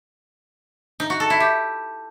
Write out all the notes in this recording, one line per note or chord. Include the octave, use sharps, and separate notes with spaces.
D#4
F#4
A4
E4
G4